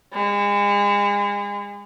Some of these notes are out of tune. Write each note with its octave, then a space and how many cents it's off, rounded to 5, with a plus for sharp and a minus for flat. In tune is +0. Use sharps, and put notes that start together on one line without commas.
G#3 -35